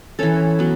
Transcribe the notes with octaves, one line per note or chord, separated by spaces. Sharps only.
E3 C#4 A4 C#5
F#3 B3